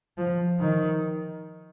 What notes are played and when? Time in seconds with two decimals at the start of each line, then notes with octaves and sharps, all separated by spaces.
0.18 F3
0.60 D#3